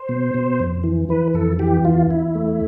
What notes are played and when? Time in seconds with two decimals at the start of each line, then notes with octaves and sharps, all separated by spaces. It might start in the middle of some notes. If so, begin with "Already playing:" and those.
Already playing: C5
0.09 B2
0.34 B2
0.59 F2
0.84 E3
1.09 E3 B4
1.34 F2 A4
1.59 E3 G4
1.85 E2 F4
2.10 E2 E4
2.35 A3